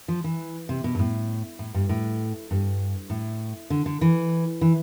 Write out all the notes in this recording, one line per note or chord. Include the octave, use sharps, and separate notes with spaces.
F3
E3
C3
B2
G2
A2
A2
G2
A2
G2
A2
D3
D3
E3
E3